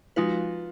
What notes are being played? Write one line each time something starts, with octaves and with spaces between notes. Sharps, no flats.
F3 G#3 D#4 F4 F#4 B4